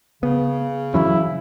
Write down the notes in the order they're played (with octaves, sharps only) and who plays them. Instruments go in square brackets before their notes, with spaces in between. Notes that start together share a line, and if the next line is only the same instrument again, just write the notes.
[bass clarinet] C#3 [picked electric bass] B3
[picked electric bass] E3 F#3 C#4 [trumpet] E4